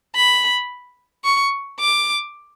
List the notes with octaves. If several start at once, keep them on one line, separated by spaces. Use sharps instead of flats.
B5
C#6
D6